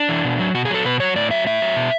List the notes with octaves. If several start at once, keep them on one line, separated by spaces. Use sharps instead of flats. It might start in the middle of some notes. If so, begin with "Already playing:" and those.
Already playing: D4
E3
B2
F#3
B2 F#4
G#4
F#3 A4
B2 B4
F#3 C#5
A2 D5
F#3 E5
A2 E5
F#3
B2